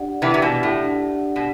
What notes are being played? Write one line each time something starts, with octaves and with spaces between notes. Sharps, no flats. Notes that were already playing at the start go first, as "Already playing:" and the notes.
Already playing: D4 G4 D5 F#5
C3 E3 D5
C3
B2
G4
A2
D4
F#5
B2